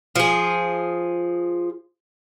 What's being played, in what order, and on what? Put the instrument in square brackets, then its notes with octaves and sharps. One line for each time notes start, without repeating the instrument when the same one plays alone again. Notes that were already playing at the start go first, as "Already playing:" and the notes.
[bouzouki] F3 G#4